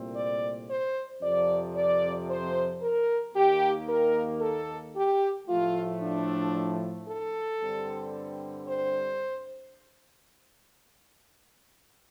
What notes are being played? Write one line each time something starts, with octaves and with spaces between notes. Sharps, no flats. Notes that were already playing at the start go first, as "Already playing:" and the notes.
Already playing: C2 A#2 A3 C4
D5
C5
F2 C3 F3 D5
D5
C5
A#4
D#2 D#3 A#3 G4
A#4
A4
G4
A2 F3 A3 F4
D4
A4
G2 D3 G3 C4
C5